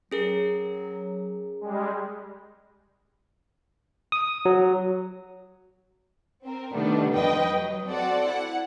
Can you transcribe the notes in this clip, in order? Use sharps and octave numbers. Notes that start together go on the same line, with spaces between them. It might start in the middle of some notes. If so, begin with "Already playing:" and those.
F#3 C#4 G#4 A#4
G3 G#3
D#6
F#3
C4 A#4
C3 D#3 G3 A3 B3 D4
F2 F3 B4 D#5 G5
F#3
C4 F#4 A4 D5 F#5
E4 F#5